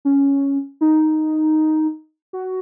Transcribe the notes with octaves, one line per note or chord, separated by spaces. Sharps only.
C#4
D#4
F#4